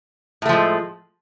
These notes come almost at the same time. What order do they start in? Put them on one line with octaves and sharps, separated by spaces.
A2 A3 F3 G#3